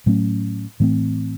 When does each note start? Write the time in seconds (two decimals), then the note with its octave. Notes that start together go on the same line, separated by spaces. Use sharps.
0.06 A2 F#3 A3 C#4
0.80 A2 E3 A3 C4